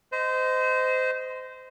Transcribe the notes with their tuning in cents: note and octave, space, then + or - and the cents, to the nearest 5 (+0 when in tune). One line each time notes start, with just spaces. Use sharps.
C5 -25 D#5 +5